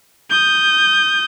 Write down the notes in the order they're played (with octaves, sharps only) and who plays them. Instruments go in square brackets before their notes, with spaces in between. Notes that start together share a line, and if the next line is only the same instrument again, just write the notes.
[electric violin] D#6 G6